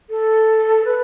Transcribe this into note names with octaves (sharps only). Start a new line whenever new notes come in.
A4
B4